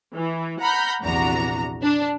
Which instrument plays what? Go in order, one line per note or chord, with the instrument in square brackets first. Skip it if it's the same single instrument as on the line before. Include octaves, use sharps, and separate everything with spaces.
[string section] E3
F#5 A#5 B5 F6 G6
A#1 E2 C3 D4 F#4 A#5
D4